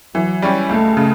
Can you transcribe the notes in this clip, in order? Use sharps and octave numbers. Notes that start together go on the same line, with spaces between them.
E3 F#3
G3 C#4 G4
C#2 A3
C#3